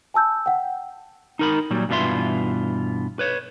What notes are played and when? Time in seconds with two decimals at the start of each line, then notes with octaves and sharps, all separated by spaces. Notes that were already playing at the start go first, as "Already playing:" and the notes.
0.14 G#5 A5 E6 G6
0.46 F#5 G5
1.39 D#4 A#4 B5
1.71 A#2 F#3 G3
1.89 G2 B2 E3 F4 E5 C6
3.19 B4 C#5